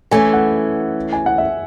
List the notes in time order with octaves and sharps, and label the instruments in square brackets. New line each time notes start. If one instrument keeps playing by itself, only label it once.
[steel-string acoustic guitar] E3 A3 C#4 [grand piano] G#5
[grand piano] F#5
G#5
F#5
E5